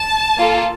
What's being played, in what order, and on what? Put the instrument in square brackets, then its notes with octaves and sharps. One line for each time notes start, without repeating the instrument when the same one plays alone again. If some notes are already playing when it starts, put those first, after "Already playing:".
Already playing: [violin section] A5
A#3 F4 A4